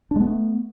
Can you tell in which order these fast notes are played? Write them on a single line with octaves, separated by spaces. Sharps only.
D4 G#3 B3 A3